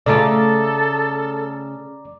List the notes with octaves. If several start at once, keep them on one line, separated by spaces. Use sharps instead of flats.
C#3 A3 F4 A4 D5 A#5 D6